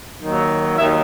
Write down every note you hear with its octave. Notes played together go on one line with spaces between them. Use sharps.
D#2 D#3 F#3
D#2 D#3 F#3 E5